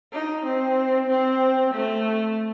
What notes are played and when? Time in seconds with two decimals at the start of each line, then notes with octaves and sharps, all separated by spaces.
0.13 D#4
0.46 C4
1.09 C4
1.74 A3